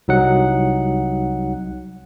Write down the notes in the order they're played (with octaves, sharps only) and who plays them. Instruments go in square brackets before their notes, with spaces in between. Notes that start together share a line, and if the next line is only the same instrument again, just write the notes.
[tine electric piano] C2 F#3 D#4 F#5